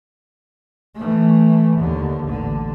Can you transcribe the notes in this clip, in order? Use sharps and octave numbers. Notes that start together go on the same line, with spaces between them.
E3 A3
D#2 D3
A1 D3